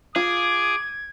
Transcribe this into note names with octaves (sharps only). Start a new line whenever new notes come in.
F4 G#4 D6 G#6